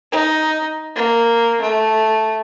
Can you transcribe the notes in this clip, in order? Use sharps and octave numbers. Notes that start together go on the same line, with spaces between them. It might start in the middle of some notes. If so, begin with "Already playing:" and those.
D#4
A#3
A3